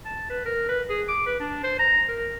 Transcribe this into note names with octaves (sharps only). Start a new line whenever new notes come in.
A5
B4
A#4
B4
G#4
D6
B4
D4
C5
A#5
A#4